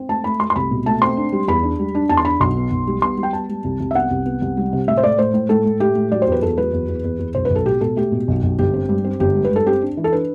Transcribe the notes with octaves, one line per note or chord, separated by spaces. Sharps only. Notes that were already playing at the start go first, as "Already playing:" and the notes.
Already playing: C4
A3 A5
A3 B5
A3 C6
C6
C2 B5
B2
A3 A5
C4 C6
D4
G3
E2 B5
D4
G3
D4
E2 A5
C6
D4 B5
B1 C6
B3
B1
G3
B3 C6
G3
G5
B3 A5
G3
C2
C2
E5
B3 F#5
C2
B3
C2
G3
C3
A2 E5
C5
A3 D5
A2 C5
A2
A2 A4
A2
A3 G4
A2
F#3 D5
E2 C5
B4
E2 A4
F#3 B4
E2
E2
E2
E2
B1 C5
B4
B1
A4
B2 G4
B2 A4
A3 G4
B2
B1
B1
G1 G4
C4
G2
C4
G1 G4
G2
B4
G2 A4
C4 G4
D4
E3
A4
D4 B4